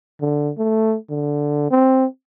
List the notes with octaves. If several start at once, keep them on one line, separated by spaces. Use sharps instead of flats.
D3
A3
D3
C4